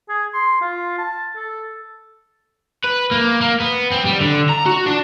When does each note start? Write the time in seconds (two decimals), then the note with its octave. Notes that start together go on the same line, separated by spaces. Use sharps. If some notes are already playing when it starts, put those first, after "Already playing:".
0.09 G#4
0.34 C6
0.61 F4
0.98 A5
1.36 A4
2.84 B4
3.11 A#3
3.41 A#3
3.60 B3
3.91 C4
4.05 G3
4.20 D3
4.49 A#5
4.66 F#4
4.87 D4